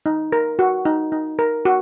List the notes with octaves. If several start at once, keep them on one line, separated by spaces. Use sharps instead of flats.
D#4
A#4
F#4
D#4
D#4
A#4
F#4